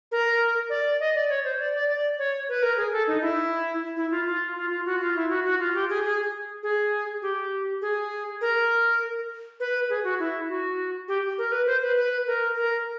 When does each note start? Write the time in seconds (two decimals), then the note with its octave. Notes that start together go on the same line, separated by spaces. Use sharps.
0.12 A#4
0.70 D5
1.00 D#5
1.15 D5
1.29 C#5
1.44 C5
1.59 D5
1.75 D5
1.88 D5
2.18 C#5
2.49 B4
2.63 A#4
2.77 G#4
2.92 A4
3.07 D#4
3.22 E4
3.97 E4
4.11 F4
4.27 F4
4.56 F4
4.70 F4
4.85 F#4
5.00 F4
5.15 E4
5.30 F#4
5.45 F#4
5.59 F4
5.75 G4
5.89 G#4
6.05 G#4
6.63 G#4
7.22 G4
7.82 G#4
8.41 A#4
9.60 B4
9.90 G#4
10.04 F#4
10.19 E4
10.49 F#4
11.08 G4
11.38 A#4
11.52 B4
11.67 C5
11.82 B4
11.97 B4
12.27 A#4
12.56 A#4